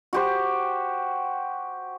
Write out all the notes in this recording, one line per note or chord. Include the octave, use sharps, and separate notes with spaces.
F#4 G4 C5